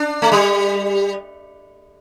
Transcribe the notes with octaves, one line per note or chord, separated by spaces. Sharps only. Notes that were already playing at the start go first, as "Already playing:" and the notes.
Already playing: D4
A3
G3